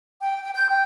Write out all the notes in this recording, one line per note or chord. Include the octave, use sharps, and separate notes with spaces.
G5
G5
G6
G5